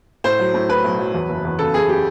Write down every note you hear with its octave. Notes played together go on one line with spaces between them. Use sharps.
A2 C5
F#3
A2
A2 B4
B1
F#3
E2
F#1
E2
C#3 A4
F#1 G#4
G4